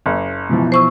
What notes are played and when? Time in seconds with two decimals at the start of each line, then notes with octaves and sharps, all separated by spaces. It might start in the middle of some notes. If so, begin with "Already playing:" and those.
0.06 F#1
0.49 B2 E3 F3
0.72 C5 C#6 E6